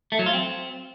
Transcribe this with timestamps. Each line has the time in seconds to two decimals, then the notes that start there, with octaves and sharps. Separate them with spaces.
0.12 A3
0.19 F#3
0.26 F4
0.33 C4